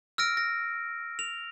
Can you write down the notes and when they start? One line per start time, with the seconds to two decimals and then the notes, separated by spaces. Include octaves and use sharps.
0.18 E6 F6 A#6 D7
0.37 A#6
1.19 F7